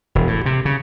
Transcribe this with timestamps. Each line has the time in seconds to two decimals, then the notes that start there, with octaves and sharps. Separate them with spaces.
0.15 E1
0.27 A2
0.46 C3
0.65 C#3